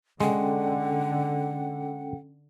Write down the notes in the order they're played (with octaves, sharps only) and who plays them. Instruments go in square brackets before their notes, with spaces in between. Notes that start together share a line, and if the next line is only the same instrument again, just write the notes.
[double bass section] D3 [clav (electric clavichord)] G#3 [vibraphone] C#4 A4 G5 [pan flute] F#5